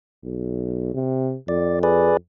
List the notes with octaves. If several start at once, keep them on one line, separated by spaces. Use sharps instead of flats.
B1
C3
F2 D5
G#4 B4 D5